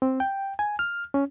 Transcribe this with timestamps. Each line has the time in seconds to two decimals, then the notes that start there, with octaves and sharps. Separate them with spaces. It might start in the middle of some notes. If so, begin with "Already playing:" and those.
0.02 C4
0.20 G5
0.59 G#5
0.79 F6
1.14 C#4